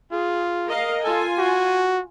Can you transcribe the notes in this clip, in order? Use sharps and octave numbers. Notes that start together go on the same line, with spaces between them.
F4 G#4
A#4 D#5 F5
F4 A4 G#5
F#4